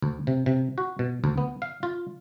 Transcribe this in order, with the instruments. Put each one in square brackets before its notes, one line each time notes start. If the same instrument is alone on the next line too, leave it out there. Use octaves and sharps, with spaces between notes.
[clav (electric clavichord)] D2
C3
C3
F#4
B2
D2
B3
F5
F4